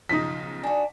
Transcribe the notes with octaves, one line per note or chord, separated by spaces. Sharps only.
B1 C#3 F3 D#4 B6
D4 F#4 G#5